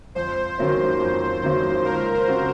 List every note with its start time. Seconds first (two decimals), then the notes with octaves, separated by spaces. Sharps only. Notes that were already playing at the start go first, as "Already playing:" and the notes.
0.15 F2 C5
0.58 D#3 F#3 A#3 C#4
1.01 F2
1.43 D#3 F#3 A#3 C#4
1.85 C#2 A#4
2.14 C5
2.28 C#3 F#3 C4 F#4